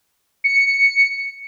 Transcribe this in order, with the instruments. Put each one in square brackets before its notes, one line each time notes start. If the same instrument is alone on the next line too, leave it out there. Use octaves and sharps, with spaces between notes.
[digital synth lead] C#7